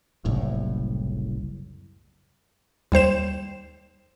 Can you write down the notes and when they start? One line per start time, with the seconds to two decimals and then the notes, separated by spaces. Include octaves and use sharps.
0.25 F#1 C2 A2
2.92 D#2 G3 C5 E7